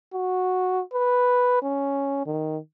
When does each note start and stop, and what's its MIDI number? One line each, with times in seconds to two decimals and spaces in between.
0.13 0.81 66
0.93 1.61 71
1.62 2.24 61
2.26 2.57 51